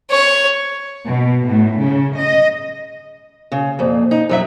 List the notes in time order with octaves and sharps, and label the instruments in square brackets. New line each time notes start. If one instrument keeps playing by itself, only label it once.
[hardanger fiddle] C#5
[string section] B2
A2
C#3
D#5
[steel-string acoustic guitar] C#3
F2 A#2
D#4
F2 F#3 E5